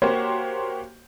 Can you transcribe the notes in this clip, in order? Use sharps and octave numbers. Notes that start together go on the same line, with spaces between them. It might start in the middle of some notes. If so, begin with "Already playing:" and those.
A#3 F#4 G4 C5 C#5